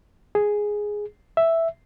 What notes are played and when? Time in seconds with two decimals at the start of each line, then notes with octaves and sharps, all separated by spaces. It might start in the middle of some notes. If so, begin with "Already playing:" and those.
0.35 G#4
1.37 E5